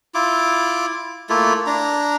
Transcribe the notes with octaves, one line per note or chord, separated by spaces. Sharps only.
E4 F4 D6
A3 A#3 E4 F4
D4 A#5